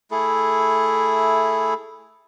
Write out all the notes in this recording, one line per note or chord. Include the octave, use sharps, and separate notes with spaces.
A3 E4 G#4 A4